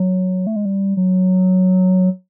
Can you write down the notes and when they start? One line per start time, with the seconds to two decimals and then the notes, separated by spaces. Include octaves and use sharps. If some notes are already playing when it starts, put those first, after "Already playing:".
Already playing: F#3
0.47 A3
0.56 G#3
0.65 G3
0.97 F#3